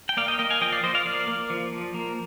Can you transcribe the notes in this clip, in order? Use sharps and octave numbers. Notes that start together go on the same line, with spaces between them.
G5
A#3 D5 F5
D#5 G5
A#3 D#5 G5
F5 G#5
F3 D#5 G5
D5 F5
F3 C5 D#5
D5 F5
A#3 D5 F5
A#3
F3
F3
A#3